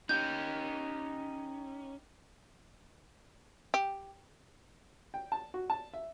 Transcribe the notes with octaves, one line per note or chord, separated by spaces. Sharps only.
C#4 D#4 G4 G6
G4
G5
A5
F#4
A5
E5